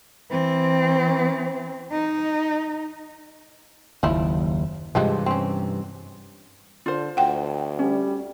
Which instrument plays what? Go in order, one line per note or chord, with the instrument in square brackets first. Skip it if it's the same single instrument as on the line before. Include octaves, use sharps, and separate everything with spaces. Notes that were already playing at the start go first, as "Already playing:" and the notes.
[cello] E3 C4
D#4
[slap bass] F#1 D#2 [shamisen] F3 E4
[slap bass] G2 C3 E3 [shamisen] F3 G3 G#3
[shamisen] C4 C#4
[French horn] D3 [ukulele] F4 C5
[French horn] D2 [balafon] F#5 G5
[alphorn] G3 [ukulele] C#4